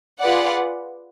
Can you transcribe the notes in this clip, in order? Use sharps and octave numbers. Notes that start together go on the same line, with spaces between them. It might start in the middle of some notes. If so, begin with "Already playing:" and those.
F4 G#4 B4 D5 F#5